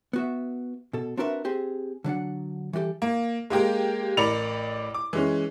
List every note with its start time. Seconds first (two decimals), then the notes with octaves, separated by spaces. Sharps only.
0.13 B3 F#4 E5
0.93 B2 A4
1.17 C4 D4 F#4 A#4 B4 E5
1.45 C4 G4 G#4
2.04 D3 F#3 D4 F#5
2.73 E3 G3 F#4 G4 A4
3.02 A#3
3.50 G#3 A#3 G4 A#4
4.17 A1 A#4 D5 B5 C#7 F7
4.94 D6
5.13 E3 G#3 C#4